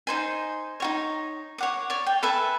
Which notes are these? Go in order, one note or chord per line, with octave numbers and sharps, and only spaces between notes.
D#4 C5 G#5
D#4 F#4 C#5
C#5 F#5 D6
C#5 D5
G5
A4 B4 E5 G#5